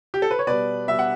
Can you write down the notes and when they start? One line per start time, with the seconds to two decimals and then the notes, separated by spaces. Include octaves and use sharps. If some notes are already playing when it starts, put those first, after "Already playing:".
0.14 G4
0.22 A4
0.31 B4
0.39 C#5
0.47 B2 G3 B4 D5
0.88 B2 G3 E5
0.99 F#5